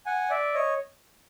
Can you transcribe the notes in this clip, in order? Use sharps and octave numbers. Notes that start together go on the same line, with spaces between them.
F#5 G#5
D5 E5
C#5 D#5